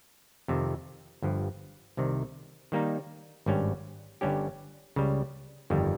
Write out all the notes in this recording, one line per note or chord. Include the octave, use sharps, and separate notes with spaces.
F2 C3 D#3
G1 G2 F3
C2 C3 D#3
D#3 G3 A#3 D#4
G#1 G2 G3 C#4
G1 G2 G3 C#4 G4
C#2 C#3 G3
G1 F2 D#3 G3